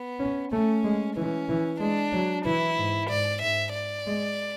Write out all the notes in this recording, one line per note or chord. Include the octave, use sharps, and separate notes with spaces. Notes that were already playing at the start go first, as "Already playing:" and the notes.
Already playing: B3
C#4
A3 C#4
G#3
E3 C#4
E3
G#3 D4
F#3
E3 E4
G#2
G#2 D5
G#2 E5
D5
G#3